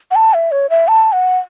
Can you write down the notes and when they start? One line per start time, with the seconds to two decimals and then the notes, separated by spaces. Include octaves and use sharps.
0.11 F#5
0.16 A5
0.34 E5
0.52 C#5
0.70 E5
0.88 A5
1.12 F#5